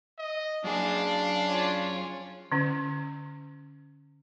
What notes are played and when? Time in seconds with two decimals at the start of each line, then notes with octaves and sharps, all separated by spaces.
0.18 D#5
0.64 F#2 D4 G#4 F5
1.48 C#4 F4
2.52 D3 C#4